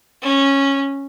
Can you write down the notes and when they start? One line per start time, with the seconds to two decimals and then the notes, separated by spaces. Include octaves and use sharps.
0.22 C#4